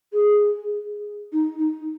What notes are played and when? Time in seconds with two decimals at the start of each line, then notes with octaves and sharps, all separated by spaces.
0.13 G#4
1.32 D#4
1.59 D#4